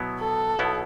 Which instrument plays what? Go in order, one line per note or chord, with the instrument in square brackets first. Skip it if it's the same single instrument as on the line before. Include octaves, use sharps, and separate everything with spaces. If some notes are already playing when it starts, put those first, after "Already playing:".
Already playing: [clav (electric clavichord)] B2 F#3 B3 E4
[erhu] A4
[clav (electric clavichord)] B1 B2 B3 E4